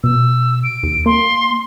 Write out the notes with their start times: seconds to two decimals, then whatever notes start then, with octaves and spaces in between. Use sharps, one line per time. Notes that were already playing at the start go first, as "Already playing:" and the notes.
0.04 B2 E6
0.63 D7
0.83 D#2
1.06 A#3 C6